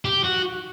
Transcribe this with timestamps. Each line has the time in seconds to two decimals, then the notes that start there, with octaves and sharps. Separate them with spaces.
0.05 G4
0.24 F#4